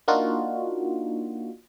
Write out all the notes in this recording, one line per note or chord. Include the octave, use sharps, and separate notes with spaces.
A#3 D4 D#4 F4 F#4